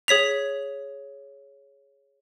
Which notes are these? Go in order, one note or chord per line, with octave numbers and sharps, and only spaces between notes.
G#4 C#5 B6 F7